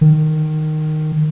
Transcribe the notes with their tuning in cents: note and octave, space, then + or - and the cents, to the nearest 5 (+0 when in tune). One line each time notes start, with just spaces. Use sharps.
D#3 -10